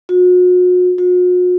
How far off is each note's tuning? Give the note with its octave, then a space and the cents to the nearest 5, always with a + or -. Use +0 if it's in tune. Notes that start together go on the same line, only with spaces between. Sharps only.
F#4 -40
F#4 -45